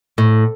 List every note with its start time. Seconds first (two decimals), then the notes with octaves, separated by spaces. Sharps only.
0.18 A2